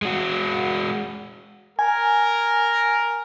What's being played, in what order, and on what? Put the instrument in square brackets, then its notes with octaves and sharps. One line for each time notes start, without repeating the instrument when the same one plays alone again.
[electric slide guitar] G#3 F#4
[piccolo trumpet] A#4 [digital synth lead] G#5